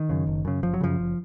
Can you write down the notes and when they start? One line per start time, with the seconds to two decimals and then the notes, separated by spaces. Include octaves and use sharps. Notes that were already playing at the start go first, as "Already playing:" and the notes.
Already playing: D#3
0.09 F#2 C#3
0.27 F#1
0.45 F#2 C#3
0.63 F#1 F3
0.74 F#3
0.81 F#2 C#3 F3
0.99 F#1